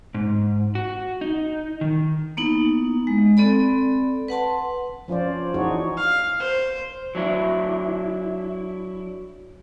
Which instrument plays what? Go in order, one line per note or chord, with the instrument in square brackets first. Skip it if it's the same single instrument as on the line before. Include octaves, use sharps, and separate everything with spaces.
[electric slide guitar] G#2
F#4
D#4
D#3
[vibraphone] A#3 B3 D#4 E4
G#3
C4 A4 D5 B5
B4 F#5 A5 C6
[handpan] F3 C#4 F4 C5 D5
E3 D4 D#4 F#4 G#4 C#5
[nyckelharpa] F5
C5
[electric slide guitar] F#3 D4 E4